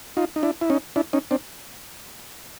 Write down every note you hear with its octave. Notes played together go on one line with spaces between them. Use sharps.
D#4 F4
D#4
D4 E4
E4
C#4 D#4
D4 E4
C#4 D#4
C4 D4